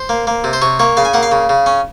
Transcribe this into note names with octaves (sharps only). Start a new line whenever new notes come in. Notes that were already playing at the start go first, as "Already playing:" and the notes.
Already playing: C5
A#3
A#3
C3
C5
C3 C#5
A#3 C#5
C#3 F5
G#5
A#3 F#5
F5
C#3
C#3
C#4